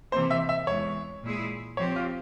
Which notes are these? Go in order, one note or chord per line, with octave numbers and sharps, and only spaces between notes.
C3 E3 A#3 C5
E5
E5
E2 E3 G#3 C#5
A#2 G#3 E4 G#4
F3 C4 G4 C#5
F4